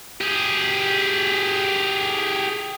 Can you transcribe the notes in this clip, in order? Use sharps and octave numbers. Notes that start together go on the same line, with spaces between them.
G4 G#4